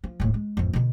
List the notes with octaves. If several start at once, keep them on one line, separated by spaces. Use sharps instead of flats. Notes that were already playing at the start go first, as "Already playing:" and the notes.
F3
D#1 A2
G#3
A1 F2
B2 D3